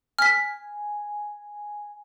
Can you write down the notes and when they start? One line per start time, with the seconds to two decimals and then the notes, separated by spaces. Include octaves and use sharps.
0.19 G#5 F6 B6